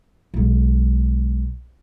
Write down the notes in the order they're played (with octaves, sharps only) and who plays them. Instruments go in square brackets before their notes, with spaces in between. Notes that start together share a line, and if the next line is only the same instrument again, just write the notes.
[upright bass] B1 G#3